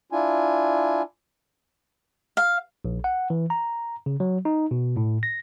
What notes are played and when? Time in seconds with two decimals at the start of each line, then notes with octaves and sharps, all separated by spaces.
0.12 D4 E4 F4 G#5
2.37 F5
2.85 A#1
3.04 F#5
3.30 E3
3.50 A#5
4.06 C#3
4.20 F#3
4.45 D#4
4.71 B2
4.97 A2
5.23 A#6